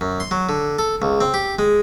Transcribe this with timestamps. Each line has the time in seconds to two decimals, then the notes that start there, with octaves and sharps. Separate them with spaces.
0.01 F#2
0.20 C6
0.31 F#3
0.49 D3
0.79 A4
1.02 C#2
1.21 C4
1.34 G4
1.59 G#3